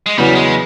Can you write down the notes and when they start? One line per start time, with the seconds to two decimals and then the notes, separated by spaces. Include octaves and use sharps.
0.06 G#3
0.18 E2 C#3 F#3 G3 B3
0.35 G#3